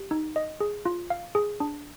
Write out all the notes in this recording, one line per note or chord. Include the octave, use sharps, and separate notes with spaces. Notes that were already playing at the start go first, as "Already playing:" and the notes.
Already playing: G4
D#4
D#5
G#4
F4
F5
G#4
D4